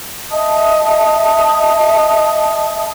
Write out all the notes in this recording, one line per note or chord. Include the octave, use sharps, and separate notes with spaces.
D#5 E5 A5 D#6